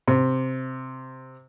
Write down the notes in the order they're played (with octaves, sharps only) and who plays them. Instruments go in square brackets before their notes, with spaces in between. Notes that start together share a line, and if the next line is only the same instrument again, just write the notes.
[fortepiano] C3